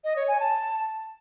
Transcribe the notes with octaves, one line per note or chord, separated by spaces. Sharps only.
D#5
C#5
G#5
A5